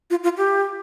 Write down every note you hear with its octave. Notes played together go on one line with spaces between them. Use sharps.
F4
F4
G4